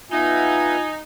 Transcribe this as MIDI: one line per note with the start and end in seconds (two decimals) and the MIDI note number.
0.12 0.76 59
0.12 1.00 63
0.12 0.85 65
0.12 0.76 76
0.12 0.76 78
0.12 0.93 80